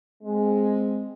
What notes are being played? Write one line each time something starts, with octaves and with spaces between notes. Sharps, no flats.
G#3 C4